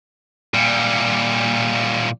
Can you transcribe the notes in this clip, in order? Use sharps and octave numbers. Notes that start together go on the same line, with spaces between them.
A#2 G3